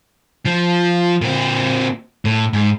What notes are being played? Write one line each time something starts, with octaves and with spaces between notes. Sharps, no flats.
F3
A#2 C4
A2
G#2